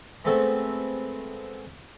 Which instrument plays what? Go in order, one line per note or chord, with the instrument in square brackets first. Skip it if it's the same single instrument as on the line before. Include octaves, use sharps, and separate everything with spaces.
[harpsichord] G#3 A3 B3 C4 A4 E5